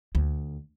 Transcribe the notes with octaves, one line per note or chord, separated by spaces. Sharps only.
D2